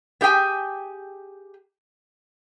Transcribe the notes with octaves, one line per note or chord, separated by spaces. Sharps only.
B3 G4 G#4 G5 G#5